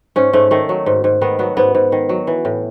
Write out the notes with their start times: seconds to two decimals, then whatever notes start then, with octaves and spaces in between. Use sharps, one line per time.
0.16 G#2 C#4
0.33 G#2 A3
0.51 D#3 A3
0.69 F#3
0.86 G#2
1.04 G#2
1.21 D#3 B3
1.39 F#3 B3
1.57 G#2 B3
1.75 G#2
1.92 D#3
2.09 F#3
2.27 E3
2.45 A2